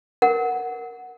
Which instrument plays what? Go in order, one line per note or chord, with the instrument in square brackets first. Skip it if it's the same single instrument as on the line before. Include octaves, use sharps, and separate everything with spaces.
[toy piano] A#4 F#5